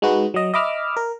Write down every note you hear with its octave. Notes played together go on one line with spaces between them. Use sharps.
G#3 D#4 F#4 B4
F#3 D#5
D#5 E5 B5 D6 E6 F6
A#4